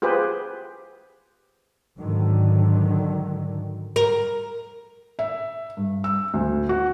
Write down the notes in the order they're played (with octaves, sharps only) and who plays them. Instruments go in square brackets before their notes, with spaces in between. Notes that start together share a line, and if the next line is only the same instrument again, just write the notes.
[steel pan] F4 G4 G#4 B4 C5
[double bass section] G#2 D3 D#3 F#3
[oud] A#4
[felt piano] E5
G2
E6
D2
F#4